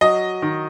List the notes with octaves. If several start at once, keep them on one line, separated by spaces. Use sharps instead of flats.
F#3 D#5
D#3